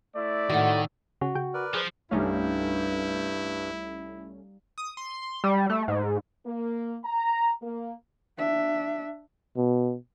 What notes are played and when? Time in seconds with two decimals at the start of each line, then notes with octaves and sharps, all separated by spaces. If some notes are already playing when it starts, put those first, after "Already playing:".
0.15 A3 E4 D5
0.50 A2 D#3 F#4
1.21 C#3 C#4 F#4
1.35 C#3 G5 G6
1.54 A#4 B4 D5
1.75 F3 G#4 C5
2.11 C2 G2 G3 A3 C#4 D#4 E4 F5
4.78 D#6
4.97 C6
5.44 G3
5.70 A3
5.88 G#2
6.46 A#3
7.04 A#5
7.62 A#3
8.38 D4 E5
9.57 B2